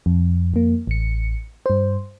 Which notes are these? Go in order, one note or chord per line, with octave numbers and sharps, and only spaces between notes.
F2
F2 A#3
A1 C#7
G2 C5